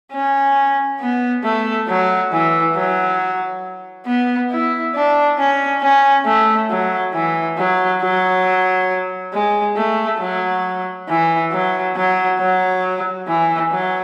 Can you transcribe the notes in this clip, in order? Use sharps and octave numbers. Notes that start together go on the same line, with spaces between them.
C#4
B3
A3
F#3
E3
F#3
B3
E4
D4
C#4
C#4
A3
F#3
E3
F#3
F#3
G#3
A3
F#3
E3
F#3
F#3
F#3
E3
F#3